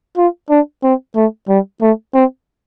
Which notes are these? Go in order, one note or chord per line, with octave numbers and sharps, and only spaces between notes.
F4
D4
C4
A3
G3
A3
C4